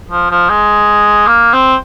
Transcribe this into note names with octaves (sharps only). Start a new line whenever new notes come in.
F3
F3
G#3
A#3
C4